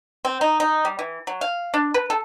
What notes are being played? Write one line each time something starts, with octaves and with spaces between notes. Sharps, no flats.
C4
D#4
D#4
G3
E3
F#3
F5
D4
B4
A4